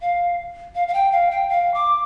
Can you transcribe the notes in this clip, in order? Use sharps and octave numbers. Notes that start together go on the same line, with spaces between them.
F5
F5
F5
G5
F5
G5
F5
D6